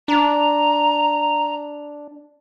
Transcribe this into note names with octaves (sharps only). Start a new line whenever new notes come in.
D4 A#5